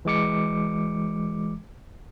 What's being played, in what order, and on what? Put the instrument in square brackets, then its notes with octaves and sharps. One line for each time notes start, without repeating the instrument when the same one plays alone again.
[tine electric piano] E3 G#3 D6 C#7